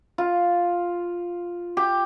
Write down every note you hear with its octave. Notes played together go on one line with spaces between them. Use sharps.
F4
G4